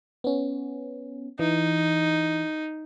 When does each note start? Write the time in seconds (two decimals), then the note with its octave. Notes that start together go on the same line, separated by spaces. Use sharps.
0.24 B3 C#4
1.39 E3 D#4